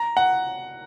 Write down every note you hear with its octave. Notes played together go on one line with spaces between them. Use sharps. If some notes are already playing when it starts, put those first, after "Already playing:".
Already playing: A#5
F#5